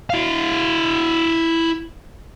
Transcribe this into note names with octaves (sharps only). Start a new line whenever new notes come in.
E4 F5